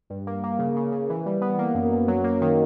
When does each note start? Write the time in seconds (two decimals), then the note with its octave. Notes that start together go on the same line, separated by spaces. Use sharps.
0.10 G2
0.27 A#3
0.44 A#3
0.59 C#3
0.76 C#3
0.92 C#3
1.10 E3
1.26 G3
1.41 B3
1.59 A#3
1.75 F#2
1.92 F#2
2.08 F#3
2.24 A#3
2.42 D#3